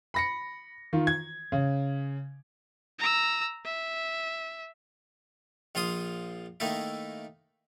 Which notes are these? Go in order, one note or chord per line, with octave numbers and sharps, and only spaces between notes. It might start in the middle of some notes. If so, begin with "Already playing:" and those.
B5 A#6 C#7
D#3 F4
G#6
C#3
A#5 E6
E5
A#1 F3 F4 C6 D#6
D#3 A3 A#3 D#4 E4